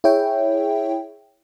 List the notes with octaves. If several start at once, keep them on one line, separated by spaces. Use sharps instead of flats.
E4 G#4 C#5 E5 G5